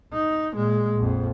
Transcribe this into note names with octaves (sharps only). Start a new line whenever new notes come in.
D#4
A#2 G#3
A#1 F2